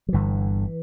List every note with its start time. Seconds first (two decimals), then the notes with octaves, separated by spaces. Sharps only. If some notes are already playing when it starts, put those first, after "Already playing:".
0.08 F#3
0.13 G1 G2 D3 E3